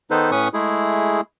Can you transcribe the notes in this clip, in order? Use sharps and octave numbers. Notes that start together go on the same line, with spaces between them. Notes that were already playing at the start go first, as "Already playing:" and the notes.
D#3 B3 D#4 A4 B4 C5
A2 C#4 B4 C#6 D#6
G#3 A3 E4 G#4